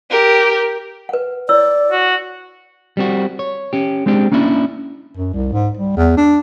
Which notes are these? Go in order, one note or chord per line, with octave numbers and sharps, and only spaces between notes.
G4 A#4
B4 F#5
E4 C#5 D5 E6
F#4
G3 C4 F#4
C#5
C#4 G4
G#3 C4 D4 G4
A#3 C#4 D4 E4
F#2
C2
G#2
G3
E2
D4